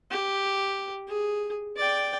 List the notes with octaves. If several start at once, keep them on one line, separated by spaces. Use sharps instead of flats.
G4
G#4
D5 G5